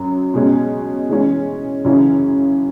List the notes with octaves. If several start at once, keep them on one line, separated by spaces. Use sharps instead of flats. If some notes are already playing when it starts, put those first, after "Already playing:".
Already playing: F#2 F#3
B2 G#3 C#4
E3 G#3 C#4
F#2 C#3 E3 C#4 E4